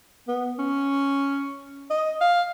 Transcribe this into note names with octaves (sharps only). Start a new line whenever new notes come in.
B3
C#4
D#5
F5